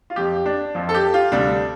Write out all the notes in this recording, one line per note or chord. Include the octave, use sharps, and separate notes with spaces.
F4
F2 F3 G4
D4
F2 F3
A4
G4
F4
D2 C3 G3 D4